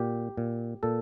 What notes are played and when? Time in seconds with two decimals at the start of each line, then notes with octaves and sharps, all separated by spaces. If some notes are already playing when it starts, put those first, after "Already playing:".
Already playing: A#2 G4
0.37 A#2
0.83 A#2 A4